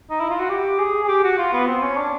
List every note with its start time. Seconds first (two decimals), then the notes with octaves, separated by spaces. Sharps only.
0.10 D#4
0.20 E4
0.30 F4
0.40 F#4
0.50 G4
0.79 G#4
1.04 G#4
1.09 G4
1.24 F#4
1.38 F4
1.53 B3
1.67 C4
1.82 C#4
1.97 D4